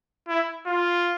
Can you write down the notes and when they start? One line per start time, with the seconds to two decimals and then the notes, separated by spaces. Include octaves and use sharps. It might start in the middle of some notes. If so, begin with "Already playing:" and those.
0.28 E4
0.67 F4